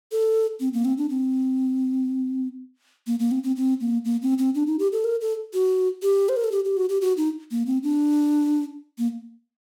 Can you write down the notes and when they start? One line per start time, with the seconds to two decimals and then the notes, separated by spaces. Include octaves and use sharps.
0.12 A4
0.60 C4
0.73 A#3
0.85 C4
0.98 D4
1.10 C4
3.07 A#3
3.19 A#3
3.31 C4
3.43 C4
3.57 C4
3.81 A#3
4.05 A#3
4.22 C4
4.38 C4
4.55 D4
4.67 D#4
4.79 G4
4.92 A4
5.04 A#4
5.21 A4
5.54 F#4
6.02 G4
6.29 C5
6.36 A#4
6.44 A4
6.52 G4
6.65 G4
6.77 F#4
6.89 G4
7.01 F#4
7.17 D#4
7.51 A#3
7.66 C4
7.83 D4
8.98 A#3